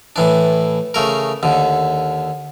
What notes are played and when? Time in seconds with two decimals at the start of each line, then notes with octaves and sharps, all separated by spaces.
0.16 A2 E3 D4
0.94 C#3 A3 A#4
1.43 D#2 D3